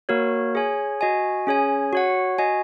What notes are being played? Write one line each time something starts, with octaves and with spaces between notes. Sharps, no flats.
A#3 F#4 A#4 C#5
G#4 C#5 G#5
F#4 D#5 G#5
C#4 G#4 C#5 G#5
F#4 C#5 F#5
F#4 D#5 G#5